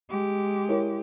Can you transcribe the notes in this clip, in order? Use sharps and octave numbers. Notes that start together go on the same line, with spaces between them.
G#3 G4
E4 A#4 C#5